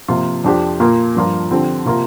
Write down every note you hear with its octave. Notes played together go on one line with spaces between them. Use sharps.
C3 F3 A#3 F4
F2 F3 D4 G4
A#2 A#3 F4 A#4
G2 F3 D4 F4 A#4
D3 F3 C4 G4
C3 A#3 F4 A#4